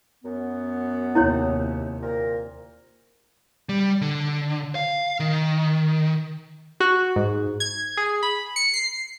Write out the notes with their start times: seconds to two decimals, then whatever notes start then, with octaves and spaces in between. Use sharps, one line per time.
0.24 F#2 B3
1.15 D#2 C3 E4 C5 C#5
2.02 A#2 C4 A#4
3.69 G3
4.01 D3
4.75 F5
5.20 D#3
6.80 F#4
7.16 G#2
7.60 G#6
7.97 G#4
8.23 B5
8.56 C#7
8.74 C7